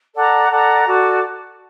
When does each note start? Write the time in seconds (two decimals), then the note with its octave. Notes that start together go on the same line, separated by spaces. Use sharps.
0.14 A4 D5 F#5 A#5
0.49 A4 D5 F#5 A#5
0.86 F#4 A4 D5